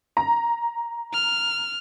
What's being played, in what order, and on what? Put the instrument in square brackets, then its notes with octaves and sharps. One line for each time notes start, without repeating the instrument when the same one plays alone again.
[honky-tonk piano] A#5
[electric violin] F6